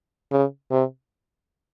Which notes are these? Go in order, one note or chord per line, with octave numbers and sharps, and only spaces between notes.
C#3
C3